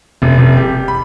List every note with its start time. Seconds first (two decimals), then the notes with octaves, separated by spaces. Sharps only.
0.22 F1
0.38 F1
0.57 G4
0.88 B5